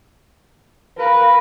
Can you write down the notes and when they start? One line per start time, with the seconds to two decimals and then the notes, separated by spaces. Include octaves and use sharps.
0.98 A#4 B4 F5